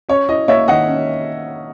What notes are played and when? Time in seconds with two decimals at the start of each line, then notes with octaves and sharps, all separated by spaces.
0.09 C#4 C#5
0.29 E4 D#5
0.48 A#3 C#5 E5
0.68 D#3 D#5 F#5
0.87 C#4